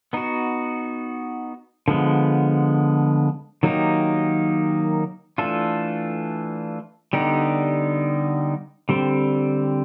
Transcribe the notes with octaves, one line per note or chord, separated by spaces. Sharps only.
B3 D#4 F#4
D3 F3 G#3 B3
D#3 F#3 A#3 D#4 G4
E3 A3 D4 F4 A4
D3 G3 B3 D#4 G4
D3 G3 C4